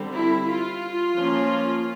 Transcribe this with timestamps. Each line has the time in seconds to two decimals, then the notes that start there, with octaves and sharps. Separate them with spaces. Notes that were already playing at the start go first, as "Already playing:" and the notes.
Already playing: D3 G3 C4
0.11 E4
0.47 F4
1.16 F3 A#3 C#4